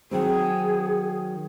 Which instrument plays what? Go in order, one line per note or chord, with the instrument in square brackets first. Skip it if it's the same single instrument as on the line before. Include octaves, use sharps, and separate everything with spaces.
[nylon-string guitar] D#3 F#3 C4 [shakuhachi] G#4